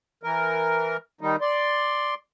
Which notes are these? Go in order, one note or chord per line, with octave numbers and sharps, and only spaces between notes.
E3 A#4
D#3 G3 D#4
D5 C6